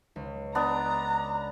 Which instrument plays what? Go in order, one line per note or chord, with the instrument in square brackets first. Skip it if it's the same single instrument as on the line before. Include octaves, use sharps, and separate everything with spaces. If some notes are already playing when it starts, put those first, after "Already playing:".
[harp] C#2
[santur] B3 D4 [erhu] A#5